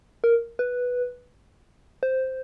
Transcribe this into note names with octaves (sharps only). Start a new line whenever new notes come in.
A#4
B4
C5